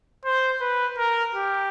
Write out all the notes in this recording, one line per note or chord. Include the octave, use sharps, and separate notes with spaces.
C5
B4
A#4
G4